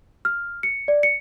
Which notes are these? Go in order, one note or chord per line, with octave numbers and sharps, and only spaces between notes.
F6
C#7
D5
C#7